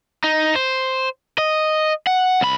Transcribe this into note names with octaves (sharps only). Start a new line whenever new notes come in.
D#4
C5
D#5
F#5
C2 B5